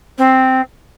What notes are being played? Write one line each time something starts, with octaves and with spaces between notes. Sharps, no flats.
C4